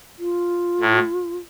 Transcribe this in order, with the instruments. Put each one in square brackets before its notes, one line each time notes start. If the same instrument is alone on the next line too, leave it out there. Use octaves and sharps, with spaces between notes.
[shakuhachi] F4
[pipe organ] A2